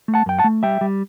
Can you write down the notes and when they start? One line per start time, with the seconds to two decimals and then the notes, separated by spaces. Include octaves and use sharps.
0.08 A3
0.14 F#5 A5
0.26 F#2 G5
0.39 F#5 A5
0.44 A3
0.63 G3 E5 G5
0.81 G3